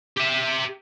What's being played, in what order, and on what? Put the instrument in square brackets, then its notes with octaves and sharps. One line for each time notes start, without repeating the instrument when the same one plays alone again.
[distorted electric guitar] G4 E5